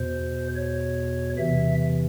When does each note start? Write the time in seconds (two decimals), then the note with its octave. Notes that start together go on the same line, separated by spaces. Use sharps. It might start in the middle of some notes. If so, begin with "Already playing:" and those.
Already playing: E2 B2 C5
0.56 C#5
1.38 E2 C3 E3 E5